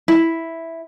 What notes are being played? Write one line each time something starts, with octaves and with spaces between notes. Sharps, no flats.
E4